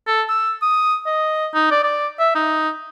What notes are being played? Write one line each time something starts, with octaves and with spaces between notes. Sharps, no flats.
A4
E6
D#6
D#5
D#4
D5
D5
E5
D#4